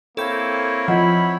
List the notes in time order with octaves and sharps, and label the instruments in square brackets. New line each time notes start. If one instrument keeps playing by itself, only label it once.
[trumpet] A#3 [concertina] C4 E4 C#5 [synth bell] A4 G6
[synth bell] F3 [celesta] F4 D#5 F#5 [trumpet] B5